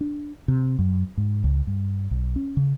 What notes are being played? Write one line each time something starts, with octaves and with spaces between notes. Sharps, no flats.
D4
C3
F#2
G#2
C#2
G2
B1
C#4
C#3